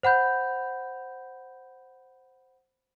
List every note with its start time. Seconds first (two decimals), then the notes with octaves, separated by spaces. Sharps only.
0.03 C5 F#5 B5 G6